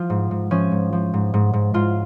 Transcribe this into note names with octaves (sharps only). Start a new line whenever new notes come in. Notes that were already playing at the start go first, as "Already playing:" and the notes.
Already playing: F3 F4
G#2
G#2
F3 C#4
G#2
F3
G#2
G#2
G#2
G#2 F4